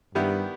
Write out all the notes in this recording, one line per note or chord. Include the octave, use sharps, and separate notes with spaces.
G2 D#3 G3 B3 E4 G4